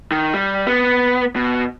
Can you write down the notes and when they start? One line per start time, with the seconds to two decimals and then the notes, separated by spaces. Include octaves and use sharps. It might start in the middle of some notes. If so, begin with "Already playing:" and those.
0.11 D#3
0.34 G3
0.67 B3
1.36 B2